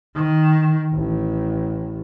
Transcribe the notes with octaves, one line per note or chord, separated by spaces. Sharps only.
D#3
A1